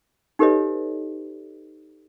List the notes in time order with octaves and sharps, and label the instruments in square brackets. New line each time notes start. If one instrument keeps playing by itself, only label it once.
[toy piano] D#4 G4 A4 B4 C#5 D#5